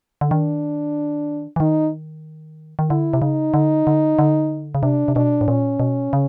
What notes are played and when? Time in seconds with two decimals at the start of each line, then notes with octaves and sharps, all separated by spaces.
0.21 D3
0.31 D#3 D4
1.56 E3
1.60 D#3 D#4
2.79 D#3
2.90 D3 E4
3.13 C3
3.22 C#3 D#4
3.54 D3
3.87 D3
4.19 D3
4.75 C#3
4.83 C3 D4
5.08 C3
5.15 B2 D4
5.41 A2
5.47 A#2 C#4
5.80 B2
6.13 C#3